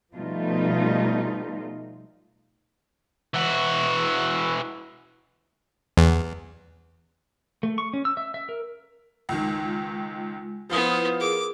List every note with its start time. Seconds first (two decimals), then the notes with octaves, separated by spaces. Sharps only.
0.15 B2 F3 G3 A3 D#4 F4
3.34 E3 F#4
5.97 E2
7.63 A3
7.78 C#6
7.93 C#4
8.05 E6
8.17 E5
8.34 E5
8.49 A#4
9.29 C#2 D#3 G#3 F4
10.70 F3 B3 E4 F4 B4 C5 D#6
11.20 G#4 A#4 D6